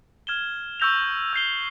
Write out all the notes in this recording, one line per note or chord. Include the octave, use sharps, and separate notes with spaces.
F6 G#6 E7 G7
C#6 E6 G6 A#6 F7
E6 G6 C7 G7